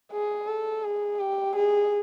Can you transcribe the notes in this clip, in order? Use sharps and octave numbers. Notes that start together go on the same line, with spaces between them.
G#4
A4
G#4
G4
G#4